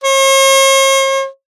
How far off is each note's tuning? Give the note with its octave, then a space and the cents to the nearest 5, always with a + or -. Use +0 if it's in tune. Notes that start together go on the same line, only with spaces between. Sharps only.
C#5 -45